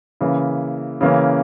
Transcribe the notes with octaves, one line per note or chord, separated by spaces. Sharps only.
C#3 E3 A#3
C#3 E3 A#3 C#4